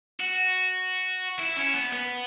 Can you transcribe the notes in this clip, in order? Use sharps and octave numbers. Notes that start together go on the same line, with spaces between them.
F#4
E4
C#4
B3
B3